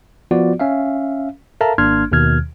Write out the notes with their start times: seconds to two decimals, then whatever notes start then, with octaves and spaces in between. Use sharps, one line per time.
0.31 F3 B3 F4 F#4 D5
0.60 C#4 E5 F5
1.61 A4 A#4 E5 F5 A5 A#5
1.78 G#1 A#3 D4 C6 F6 G#6
2.12 D#2 B2 D#3 F6 G#6